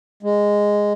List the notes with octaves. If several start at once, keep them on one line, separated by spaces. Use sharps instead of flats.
G#3